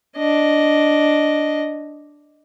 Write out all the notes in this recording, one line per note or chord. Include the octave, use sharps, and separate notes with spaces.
D4 D#5